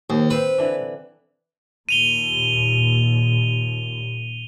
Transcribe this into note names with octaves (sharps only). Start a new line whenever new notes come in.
D#2 C5
C4 B4 C5 F5
D3 E3 D4
D#2 A#2 D#7 F7 G7